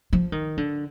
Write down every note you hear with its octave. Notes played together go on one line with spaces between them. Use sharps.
F3
D#3
D3